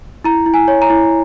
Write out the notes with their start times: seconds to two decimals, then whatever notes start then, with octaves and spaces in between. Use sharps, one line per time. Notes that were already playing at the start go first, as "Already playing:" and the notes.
0.24 E4 A#5
0.46 E4
0.54 G#5
0.68 C#5
0.82 A#5
0.90 E4